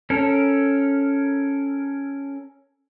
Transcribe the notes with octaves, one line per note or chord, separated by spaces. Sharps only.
C#4 A4 A#4